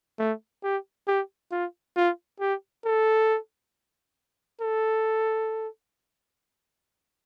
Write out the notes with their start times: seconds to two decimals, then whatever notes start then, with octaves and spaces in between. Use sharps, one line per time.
0.19 A3
0.63 G4
1.07 G4
1.52 F4
1.96 F4
2.40 G4
2.85 A4
4.61 A4